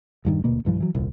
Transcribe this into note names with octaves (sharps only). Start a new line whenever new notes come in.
E1 G2 D#3
D#1 D2 B2 A#3
B1 G2 E3 F3
E3 F#3
D#1 C2